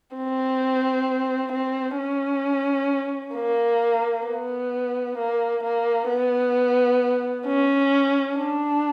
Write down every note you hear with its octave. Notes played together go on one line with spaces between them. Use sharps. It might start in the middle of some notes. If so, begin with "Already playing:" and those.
C4
C4
C#4
A#3
B3
A#3
A#3
B3
C#4
D4